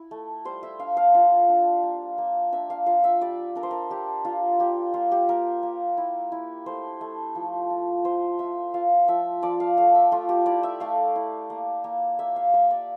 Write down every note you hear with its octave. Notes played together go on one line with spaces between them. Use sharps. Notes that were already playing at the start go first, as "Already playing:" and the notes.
Already playing: E4
A3
G3 C5
E5
D4 F5
F5
F4 F5
D4
A#3
A#3
D4 E5
F5
F4 F5
E5
G3 D5
D4 A#4
C5
A#4
D4 G4
D4 F4
A#3 G4
A#3 F4
G4
A#3 A#4
A#3
E4
E4
A3 C5
A3
F3
F4
A3 C5
F4 E5
F4 F5
F3 E5
F3 D5
F5
A3 F5
E5
A3 F4
G4
E4 D5
E5
A3 F5
E4
A#3
A#3
A#3 E5
F5
A#3 E5
D5